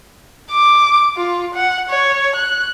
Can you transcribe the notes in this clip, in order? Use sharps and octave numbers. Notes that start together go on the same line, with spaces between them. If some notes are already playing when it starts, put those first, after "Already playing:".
D6
F4
F#5
C#5
F#6